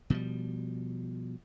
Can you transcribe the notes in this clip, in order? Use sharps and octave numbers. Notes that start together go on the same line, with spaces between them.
B2 F3 G3